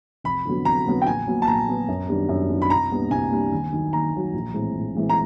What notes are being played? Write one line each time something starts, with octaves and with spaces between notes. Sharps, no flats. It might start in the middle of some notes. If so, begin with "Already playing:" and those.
F1 B5
F2 D3 F#3 B3
F1 A#5
F2 D3 F#3 B3
G5
A#1 G#5
A#2 F#3 B3
A5
A#1 A#5
A#2 F#3 B3
F#2
D#3 G3 B3 D4
F#2
D#3 G3 B3 D4
B5
C2 A#5
A#2 G3 B3 D4
C2 G#5
A#2 G3 B3 D4
D#2
D#3 F#3
D#2 A#5
D#3 F#3
A#1
A2 E3 G#3 C4
A#1
A2 E3 G#3 C4
A#5